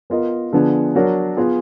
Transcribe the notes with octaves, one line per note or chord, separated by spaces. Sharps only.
B3 F4 A#4 D#5
D3 F3 B3 D4 G#4
F#3 D4 F#4 A#4
B3 F4 G#4